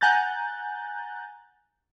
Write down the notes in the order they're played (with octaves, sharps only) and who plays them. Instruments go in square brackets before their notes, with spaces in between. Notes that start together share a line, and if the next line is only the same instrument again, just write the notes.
[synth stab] F#5 G#5 A#5 F#6 G6 A6